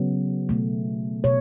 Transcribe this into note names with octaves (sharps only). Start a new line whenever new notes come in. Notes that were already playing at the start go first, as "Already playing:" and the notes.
Already playing: C#3 F#3 B3
B2 A3
B2 C#5